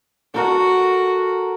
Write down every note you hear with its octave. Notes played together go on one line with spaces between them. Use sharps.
F#4 A4 A#4 F#5